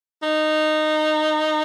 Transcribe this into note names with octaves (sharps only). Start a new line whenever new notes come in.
D#4